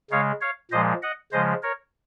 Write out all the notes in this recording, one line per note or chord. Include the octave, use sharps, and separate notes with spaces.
C#3 G#3 C#5 F5
C#5 F5
A#2 F3 G#3 C5 D#5
D#5 F#5
C#3 F3 G#3 C5 D#5
A#4 C#5